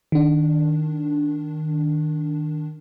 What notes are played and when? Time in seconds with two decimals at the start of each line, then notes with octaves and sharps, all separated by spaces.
0.12 D#3 D4